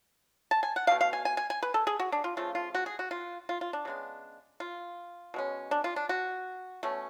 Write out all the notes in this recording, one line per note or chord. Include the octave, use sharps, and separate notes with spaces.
A5
G#5
F#5
B2 A3 D4 F5
F5
G#5
G#5
G#5
G#5
B4
A4
G#4
F#4
D4
F4
C#3 F3 A3 F4
F4
F#4
G#4
F#4
F4
F4
F4
D4
C#3 G#3 B3 D4
F4
B2 G#3 C#4
D4
F4
D4
F#4
B2 A3 C#4